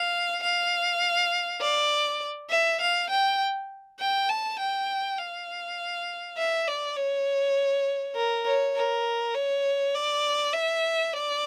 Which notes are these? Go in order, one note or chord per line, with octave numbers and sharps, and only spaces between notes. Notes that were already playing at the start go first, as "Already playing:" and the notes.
Already playing: F5
F5
D5
E5
F5
G5
G5
A5
G5
F5
E5
D5
C#5
A#4
C#5
A#4
C#5
D5
E5
D5